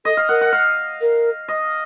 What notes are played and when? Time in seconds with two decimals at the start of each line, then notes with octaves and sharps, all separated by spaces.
0.05 A4 D#5
0.17 F5
0.29 A#4 F#5
0.41 F#5
0.52 F5
1.01 A#4
1.48 D#5